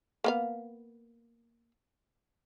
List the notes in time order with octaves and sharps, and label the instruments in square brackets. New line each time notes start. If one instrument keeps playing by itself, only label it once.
[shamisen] A#3 B3 F5